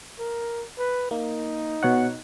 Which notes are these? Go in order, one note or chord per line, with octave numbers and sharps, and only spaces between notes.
A#4
B4
A#3 D#4
B2 C#5 F#5